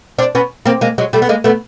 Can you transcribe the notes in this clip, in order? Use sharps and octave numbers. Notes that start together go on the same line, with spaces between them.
C4 D4
B3 C#4
A#3 C4
G#3 A#3
F#3 G#3
G3 A3
B3
G#3 A#3
A3 B3